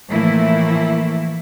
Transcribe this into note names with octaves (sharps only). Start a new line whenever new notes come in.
A2 E3 F3 A3 A#3 E4